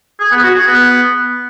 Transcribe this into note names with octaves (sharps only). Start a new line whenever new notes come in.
G#4
B3
F#4
G#4
B3